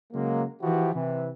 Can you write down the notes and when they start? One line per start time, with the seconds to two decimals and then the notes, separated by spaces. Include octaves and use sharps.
0.12 C#3 F#3 G#3 A#3
0.62 E3 F3 E4 F#4 G4
0.94 C3 E3